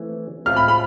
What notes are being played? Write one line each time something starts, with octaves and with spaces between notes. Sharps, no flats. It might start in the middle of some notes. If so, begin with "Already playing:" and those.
Already playing: E3 A3 C4 E4
A2 G#3 C4 F4 F6
B5
B5